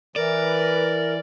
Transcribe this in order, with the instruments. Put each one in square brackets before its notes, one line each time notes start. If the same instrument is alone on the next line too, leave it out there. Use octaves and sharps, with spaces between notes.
[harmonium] E3 [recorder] A#4 [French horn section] B4 [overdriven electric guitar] D5